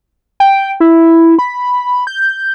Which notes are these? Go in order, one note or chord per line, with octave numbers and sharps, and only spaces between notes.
G5
E4
B5
G6